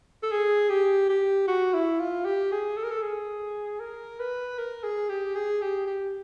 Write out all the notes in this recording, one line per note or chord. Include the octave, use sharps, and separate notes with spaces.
A4
G#4
G4
G4
F#4
E4
F4
G4
G#4
A4
A#4
A4
G#4
A#4
B4
A#4
G#4
G4
G#4
G4
G4